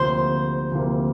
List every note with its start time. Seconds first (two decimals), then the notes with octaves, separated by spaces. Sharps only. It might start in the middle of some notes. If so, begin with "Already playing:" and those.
Already playing: D2 C3 F3 A#3 C5
0.72 D2 C3 F3 A#3